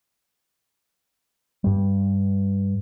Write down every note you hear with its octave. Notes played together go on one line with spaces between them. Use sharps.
G2 G3